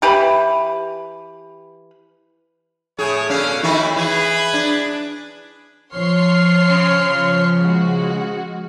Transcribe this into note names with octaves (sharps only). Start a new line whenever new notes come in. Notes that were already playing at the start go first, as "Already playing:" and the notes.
E3 G4 B4 B5
A2 G#4 C#5
B2 D3 C#4 F5
D#3 A3 D#4 E4 F#4
E3 G#4 B4
D4
F3 C#5 C6 F6 C7
C#3
G#3 F#4